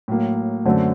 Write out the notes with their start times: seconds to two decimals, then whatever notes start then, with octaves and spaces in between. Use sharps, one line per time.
0.08 A2 F#3 A#3
0.65 F#2 D3 F#3 A3 C4